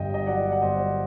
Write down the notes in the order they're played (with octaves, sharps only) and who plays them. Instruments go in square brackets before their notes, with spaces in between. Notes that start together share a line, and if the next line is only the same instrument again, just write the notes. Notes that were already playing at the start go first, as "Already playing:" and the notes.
Already playing: [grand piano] G1 G2 D#5 G5
D#5
F#3 D5 F#5
F#5
G1 C5 D#5